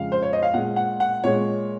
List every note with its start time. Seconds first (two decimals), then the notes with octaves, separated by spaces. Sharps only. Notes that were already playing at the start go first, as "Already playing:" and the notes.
Already playing: F2 C#3 G#3 F5
0.12 C5
0.22 C#5
0.33 D#5
0.43 F5
0.54 A#2 G#3 F#5
0.76 F#5
1.00 F#5
1.24 A#2 G#3 C#5